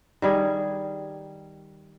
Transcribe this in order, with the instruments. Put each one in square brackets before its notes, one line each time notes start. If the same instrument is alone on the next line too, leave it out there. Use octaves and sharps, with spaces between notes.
[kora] D#3 G3 G#4